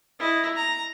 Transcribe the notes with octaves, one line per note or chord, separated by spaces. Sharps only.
E4 D#5
A#5